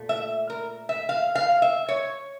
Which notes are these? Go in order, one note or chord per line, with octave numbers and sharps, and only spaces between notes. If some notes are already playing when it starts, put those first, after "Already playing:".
Already playing: A#2 A3
E5
A#4
E5
F5
F5
E5
C#5